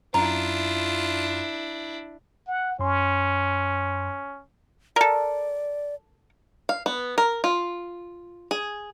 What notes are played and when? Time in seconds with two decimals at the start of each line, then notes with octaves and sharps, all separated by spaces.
0.14 F#2 D4 E4 F4 A#5
2.48 F#5
2.79 F#2 C#4 C6
4.96 A4 A#4 D5
6.69 F5
6.86 B3
7.18 A#4
7.44 F4
8.51 G#4